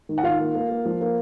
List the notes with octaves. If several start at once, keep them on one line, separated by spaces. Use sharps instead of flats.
D#3
F#5
D#3 F4 F5
A#3
A#3
A#3
F3
A#3